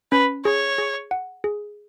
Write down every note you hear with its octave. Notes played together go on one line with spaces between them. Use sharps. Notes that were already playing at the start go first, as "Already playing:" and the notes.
C#4 B4
G#4 C#5
G#4
F#5
G#4